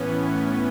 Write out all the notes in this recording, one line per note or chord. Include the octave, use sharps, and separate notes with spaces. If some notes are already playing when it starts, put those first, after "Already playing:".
Already playing: A2 E3 B3 C#4